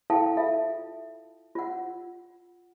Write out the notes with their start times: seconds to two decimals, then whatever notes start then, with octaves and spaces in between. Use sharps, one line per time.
0.10 E4 A4 F5 G5 A5
0.37 F4 A4 E5
1.55 F4 F#5